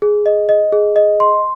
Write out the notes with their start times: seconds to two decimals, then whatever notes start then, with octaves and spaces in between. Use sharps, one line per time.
0.02 G#4
0.26 D#5
0.49 D#5
0.72 G#4
0.96 D#5
1.20 C6